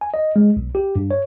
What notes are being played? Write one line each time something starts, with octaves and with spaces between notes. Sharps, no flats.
G#5
D#5
G#3
B1
G4
G2
C#5